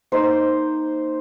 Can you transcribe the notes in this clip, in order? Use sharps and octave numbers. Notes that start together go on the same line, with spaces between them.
A#3 D#4 C5